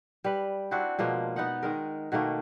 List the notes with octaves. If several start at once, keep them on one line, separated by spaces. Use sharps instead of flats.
G3 B4
C4 D4 E4 F#4
B2 F3 G#3 A#3
B3 D#4 F#5
D#3 G#3 A#4
B2 D#3 A3 A#3